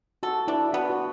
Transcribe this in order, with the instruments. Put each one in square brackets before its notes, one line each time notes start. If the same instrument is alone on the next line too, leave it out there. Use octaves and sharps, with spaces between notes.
[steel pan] F#4 [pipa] A4
[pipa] D4 [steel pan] E4
[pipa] B3 [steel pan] F#4
[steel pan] F#4